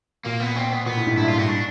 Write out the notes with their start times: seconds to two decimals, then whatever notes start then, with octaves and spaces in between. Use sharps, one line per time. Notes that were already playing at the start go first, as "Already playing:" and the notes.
0.25 A#2 A#3
0.40 B3
0.56 B2 C4
0.72 B3
0.86 A#2 B3
0.97 A2
1.07 G#2
1.17 G2 E4
1.28 F4
1.38 G2 F#4
1.48 D4